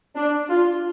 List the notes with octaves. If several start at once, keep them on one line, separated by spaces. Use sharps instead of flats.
D4
F4